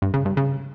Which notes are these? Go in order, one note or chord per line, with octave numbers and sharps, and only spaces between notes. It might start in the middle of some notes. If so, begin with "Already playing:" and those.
G2
C#3
G2
C#3